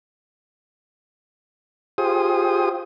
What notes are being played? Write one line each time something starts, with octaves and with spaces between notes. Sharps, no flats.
F4 G4 G#4 C5 D#6